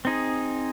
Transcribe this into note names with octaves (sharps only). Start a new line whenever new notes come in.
C4 D#4 G#4